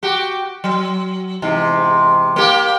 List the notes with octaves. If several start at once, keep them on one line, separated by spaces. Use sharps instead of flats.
F#4 G4
F#3
E2 G#2 C3
A#3 G4